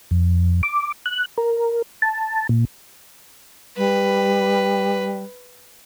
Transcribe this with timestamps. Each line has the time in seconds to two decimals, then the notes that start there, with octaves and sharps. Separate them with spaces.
0.11 F2
0.63 D6
1.06 F#6
1.38 A#4
2.02 A5
2.49 A#2
3.77 G3 B4